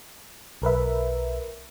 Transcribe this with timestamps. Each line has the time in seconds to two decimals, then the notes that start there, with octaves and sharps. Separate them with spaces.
0.62 B1 A#4 B4 E5